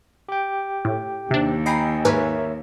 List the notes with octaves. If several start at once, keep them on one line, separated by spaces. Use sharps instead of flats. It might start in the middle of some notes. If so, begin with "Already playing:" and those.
G4 G5
A2
D#2 C3 D4
D#5 G5 G#5 A#5 B5 C7
G#2 A#4 B4 C#5 E5 G#5